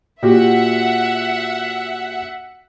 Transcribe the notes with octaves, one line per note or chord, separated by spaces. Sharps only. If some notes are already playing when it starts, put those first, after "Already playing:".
A#2 F#4 G4 E5 F#5